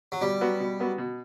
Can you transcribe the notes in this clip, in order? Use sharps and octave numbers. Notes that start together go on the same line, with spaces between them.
F#3
B2 G3
F#3 B3 F#4
B2
F#3 B3 F#4
B2